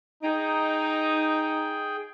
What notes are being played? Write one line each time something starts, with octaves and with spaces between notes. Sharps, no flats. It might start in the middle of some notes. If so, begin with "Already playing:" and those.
D#4 G#4 G5